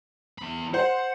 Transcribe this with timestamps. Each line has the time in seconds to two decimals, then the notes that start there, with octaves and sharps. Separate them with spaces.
0.38 E2 B5
0.74 C5 F#5